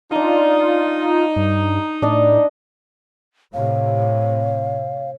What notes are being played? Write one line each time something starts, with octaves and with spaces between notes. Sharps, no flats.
D4 D#4 F4 A#5
G2
A2 D4 D#5
A2 C3 C#5 F5